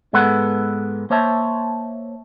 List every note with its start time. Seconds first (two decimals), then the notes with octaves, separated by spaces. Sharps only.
0.13 G#2 G#3 B3 A4 B4 F#5
1.10 A#3 C5 C#5 E5 A5